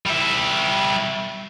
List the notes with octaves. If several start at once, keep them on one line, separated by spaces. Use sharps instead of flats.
G3 E5